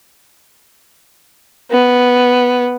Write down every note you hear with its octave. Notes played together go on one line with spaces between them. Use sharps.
B3